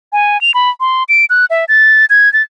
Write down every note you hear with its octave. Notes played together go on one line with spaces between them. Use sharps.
G#5
F7
B5
C6
D7
F#6
E5
A6
G#6
A6